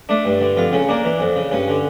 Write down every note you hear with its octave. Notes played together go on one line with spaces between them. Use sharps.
A3 D4
G2
D3
F2 F4
C#3 C#4
A#3 D4
E3
F2
C#3
G2 C#4
D3